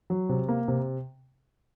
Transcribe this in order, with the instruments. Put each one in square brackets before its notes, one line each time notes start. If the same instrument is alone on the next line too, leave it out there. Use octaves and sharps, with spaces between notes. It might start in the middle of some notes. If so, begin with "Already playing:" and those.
[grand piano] F#3
C3
A#3
C3